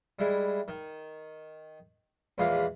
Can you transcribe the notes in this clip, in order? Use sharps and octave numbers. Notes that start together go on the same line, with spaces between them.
G3 G#3 E4
D#3
A#1 E2 G#3 F4 F5 B5